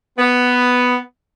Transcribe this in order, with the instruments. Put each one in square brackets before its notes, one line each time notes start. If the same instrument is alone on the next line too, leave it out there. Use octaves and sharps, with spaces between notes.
[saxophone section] B3